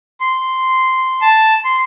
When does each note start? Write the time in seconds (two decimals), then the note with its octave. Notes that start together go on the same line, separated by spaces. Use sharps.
0.20 C6
1.22 A5
1.65 C6